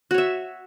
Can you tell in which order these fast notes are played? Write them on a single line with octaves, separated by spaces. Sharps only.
F#4 C#5 E5